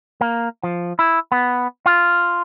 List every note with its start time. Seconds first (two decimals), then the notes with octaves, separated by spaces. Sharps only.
0.21 A#3
0.63 F3
0.99 E4
1.32 B3
1.86 F4